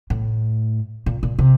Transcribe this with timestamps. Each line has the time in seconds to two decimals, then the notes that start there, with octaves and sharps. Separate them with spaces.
0.10 A2
1.06 A#2
1.23 A#2
1.39 C3